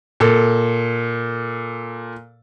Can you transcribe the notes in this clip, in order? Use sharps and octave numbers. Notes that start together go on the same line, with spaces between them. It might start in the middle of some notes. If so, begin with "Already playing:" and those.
A#2 A4